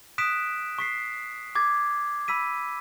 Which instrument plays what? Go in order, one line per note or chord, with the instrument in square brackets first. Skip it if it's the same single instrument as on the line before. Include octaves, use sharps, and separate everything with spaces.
[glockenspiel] D#6 F#6 B6 D7 E7
C#6 B6 C7
D6 G#6 A6
B5 E6 B6 D#7